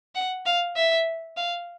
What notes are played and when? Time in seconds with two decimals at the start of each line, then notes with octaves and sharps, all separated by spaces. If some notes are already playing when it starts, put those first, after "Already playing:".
0.15 F#5
0.46 F5
0.76 E5
1.37 F5